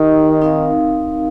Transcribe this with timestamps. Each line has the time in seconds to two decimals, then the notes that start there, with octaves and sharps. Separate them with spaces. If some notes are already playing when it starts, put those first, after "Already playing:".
Already playing: D#3 D#4 G4 D#5
0.42 C4 D#4 A#4 F5